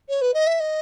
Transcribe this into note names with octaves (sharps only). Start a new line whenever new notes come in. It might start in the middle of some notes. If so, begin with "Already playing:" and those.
C#5
B4
D#5
E5
D#5